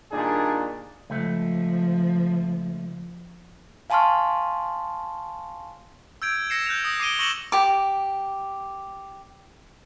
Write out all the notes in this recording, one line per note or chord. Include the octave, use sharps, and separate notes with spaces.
A#2 D#3 G3 D4 G#4
C#2 F3 A3
F5 G#5 A5 C6 C#6 F6
E6 G6 G#6 D7
E6 A#6 C7 C#7 E7
F#6 G6 A#6 F7
D#6 A#6
D6 C7 D7 D#7 G7
C#6 E6 A#6 C#7 E7 F#7
G4 D6